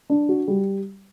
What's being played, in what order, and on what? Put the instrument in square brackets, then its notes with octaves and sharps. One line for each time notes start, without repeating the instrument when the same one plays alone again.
[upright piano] D4
F#4
G3